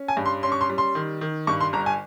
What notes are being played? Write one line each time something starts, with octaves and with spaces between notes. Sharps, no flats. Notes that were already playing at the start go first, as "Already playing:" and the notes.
Already playing: C#4
G#5
G2
C6
C#4 C6
C#6
C6
G3
C6
D#3
D#3
G2 C#6
C6
G1 A#5
G#5